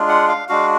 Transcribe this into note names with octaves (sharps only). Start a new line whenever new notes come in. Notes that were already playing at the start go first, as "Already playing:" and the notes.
Already playing: G#3 D4 F4
F#5
F5
G#3 D4 F#4 F5